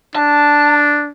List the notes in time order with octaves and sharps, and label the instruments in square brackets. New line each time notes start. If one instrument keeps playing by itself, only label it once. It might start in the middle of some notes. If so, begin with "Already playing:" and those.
[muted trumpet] D4 [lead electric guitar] A5